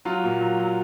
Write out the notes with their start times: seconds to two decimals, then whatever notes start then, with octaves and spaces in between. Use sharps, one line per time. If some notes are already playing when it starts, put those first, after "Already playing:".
0.05 F#3 F4
0.24 A#2
0.41 F#3
0.59 F#3